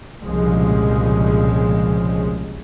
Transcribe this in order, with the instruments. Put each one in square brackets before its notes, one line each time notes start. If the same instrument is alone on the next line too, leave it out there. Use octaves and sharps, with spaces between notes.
[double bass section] C2 A#2 C#3 F3 G#3